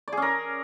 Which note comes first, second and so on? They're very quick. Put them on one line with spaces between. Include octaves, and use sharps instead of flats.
D5 G#4 C#4 A#4